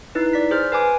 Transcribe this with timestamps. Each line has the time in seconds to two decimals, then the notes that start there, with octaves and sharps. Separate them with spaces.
0.15 D#4 E4 B4
0.33 D5 B6
0.51 G#4 C5 F6
0.72 B4 G#5 D6